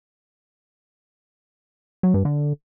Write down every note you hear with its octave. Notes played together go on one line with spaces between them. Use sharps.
F#3
G2
D3